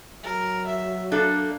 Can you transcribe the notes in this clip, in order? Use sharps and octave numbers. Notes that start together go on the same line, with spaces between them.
F#3 A#4
E5
A3 A#3 D4 A4